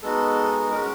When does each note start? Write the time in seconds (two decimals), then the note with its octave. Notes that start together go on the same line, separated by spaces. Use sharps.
0.02 G#3 B3 D#4 F#4 A4
0.70 G#3 C#4 F#4 A#4